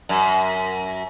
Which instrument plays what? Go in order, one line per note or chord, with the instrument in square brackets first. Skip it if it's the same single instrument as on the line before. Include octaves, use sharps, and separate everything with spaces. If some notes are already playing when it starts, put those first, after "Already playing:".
[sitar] F#2